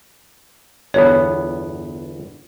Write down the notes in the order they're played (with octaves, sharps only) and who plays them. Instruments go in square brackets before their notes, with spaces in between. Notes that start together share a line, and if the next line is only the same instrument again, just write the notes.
[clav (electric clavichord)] G1 E2 B3 [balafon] C#5